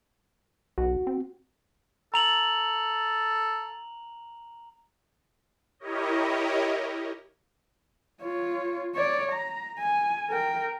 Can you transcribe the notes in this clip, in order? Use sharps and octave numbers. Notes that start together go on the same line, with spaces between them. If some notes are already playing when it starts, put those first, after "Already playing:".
B1 F#4
C4
A4 A#5 F7 F#7
E4 G4 A#4 C#5 D#5
F4 C#5
C#5 D5
A#5
G#5
A#4 G5